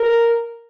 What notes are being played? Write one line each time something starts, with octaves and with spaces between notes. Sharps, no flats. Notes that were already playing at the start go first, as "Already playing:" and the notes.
Already playing: A#4